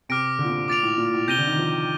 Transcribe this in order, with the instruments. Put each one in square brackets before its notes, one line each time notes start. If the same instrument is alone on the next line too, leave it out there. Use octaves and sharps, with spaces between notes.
[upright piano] C3 [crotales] D6 F6 A#6 D7
[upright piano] D3
A#2
C3
[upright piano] A#2 [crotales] D6 A6 D7 F7
[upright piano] A2
A#2
A2
[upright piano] C3 [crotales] G6 A#6 D#7 G7
[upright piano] D3
D#3
F3